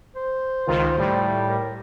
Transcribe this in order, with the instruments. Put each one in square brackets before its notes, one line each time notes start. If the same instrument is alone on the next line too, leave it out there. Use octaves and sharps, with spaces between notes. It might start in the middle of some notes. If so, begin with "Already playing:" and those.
[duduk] C5
[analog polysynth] C#2 D#3 [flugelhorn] F4
[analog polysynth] A2 [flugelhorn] G3
[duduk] A#4